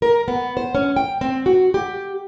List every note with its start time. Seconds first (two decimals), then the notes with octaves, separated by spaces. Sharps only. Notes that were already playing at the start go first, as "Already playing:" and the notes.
0.02 A#4
0.28 B3
0.57 C5
0.75 C#4
0.96 G5
1.21 C4
1.46 F#4
1.74 G4